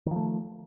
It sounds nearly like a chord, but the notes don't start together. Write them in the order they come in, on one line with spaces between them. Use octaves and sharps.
D#3 F3 A3